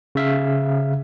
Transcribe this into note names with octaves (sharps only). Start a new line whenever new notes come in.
C#3 E5 F5